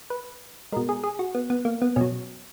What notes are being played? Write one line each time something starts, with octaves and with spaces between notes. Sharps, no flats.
B4
B2 G#3 A#4
G#4
G#4
F#4
B3
B3
A#3
B3
B2 F#3 C#4